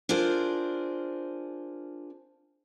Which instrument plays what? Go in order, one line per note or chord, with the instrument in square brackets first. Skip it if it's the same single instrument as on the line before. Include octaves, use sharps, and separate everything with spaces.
[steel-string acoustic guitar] D4 F4 G#4 A#4 C5